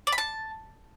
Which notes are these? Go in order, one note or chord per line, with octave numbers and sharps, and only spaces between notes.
D5
B5
A5